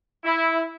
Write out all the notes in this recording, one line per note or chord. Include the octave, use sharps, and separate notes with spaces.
E4